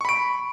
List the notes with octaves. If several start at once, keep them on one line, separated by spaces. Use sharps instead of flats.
B5 C#6 D7